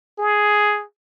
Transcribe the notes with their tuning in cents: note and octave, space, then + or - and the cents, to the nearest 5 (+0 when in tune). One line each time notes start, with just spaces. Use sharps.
G#4 +5